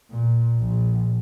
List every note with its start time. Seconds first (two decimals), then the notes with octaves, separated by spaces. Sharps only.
0.11 A#2
0.60 A#1